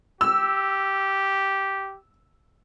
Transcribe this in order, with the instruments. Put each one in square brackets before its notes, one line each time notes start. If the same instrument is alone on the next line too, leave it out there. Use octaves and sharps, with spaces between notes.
[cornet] G4 [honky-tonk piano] E6